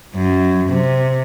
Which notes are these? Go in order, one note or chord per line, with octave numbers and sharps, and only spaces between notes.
F#2
C3